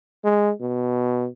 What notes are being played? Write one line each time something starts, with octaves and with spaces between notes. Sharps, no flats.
G#3
B2